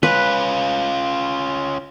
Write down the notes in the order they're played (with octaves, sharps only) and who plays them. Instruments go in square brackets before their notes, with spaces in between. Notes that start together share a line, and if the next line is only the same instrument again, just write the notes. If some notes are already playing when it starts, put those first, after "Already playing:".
[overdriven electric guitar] C#4 F4 [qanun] B4